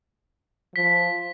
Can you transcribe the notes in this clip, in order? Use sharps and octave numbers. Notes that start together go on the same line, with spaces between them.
F3 B6